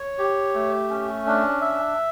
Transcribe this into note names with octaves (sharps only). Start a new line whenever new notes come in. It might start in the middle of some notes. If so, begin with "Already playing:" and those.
Already playing: C#5
G4
A3
C#4
D4
E5